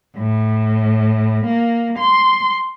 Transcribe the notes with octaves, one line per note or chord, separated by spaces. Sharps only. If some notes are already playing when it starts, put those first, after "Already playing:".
A2
A#3
C6